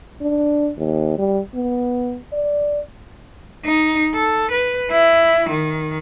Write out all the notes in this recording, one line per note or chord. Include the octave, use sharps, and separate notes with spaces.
D4
D#2
G3
B3
D5
D#4
A4
B4
E4
D#3